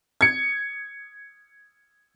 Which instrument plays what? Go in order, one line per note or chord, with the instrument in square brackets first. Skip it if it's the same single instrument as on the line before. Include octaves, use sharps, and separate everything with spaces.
[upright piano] G#6 C#7